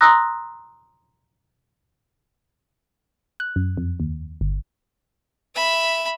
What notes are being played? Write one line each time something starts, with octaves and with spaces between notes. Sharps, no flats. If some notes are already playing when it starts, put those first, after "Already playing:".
A#5 C6 D#6 E6 F#6 A#6
F#6
F#2
F2
D#2
G1
E5 B5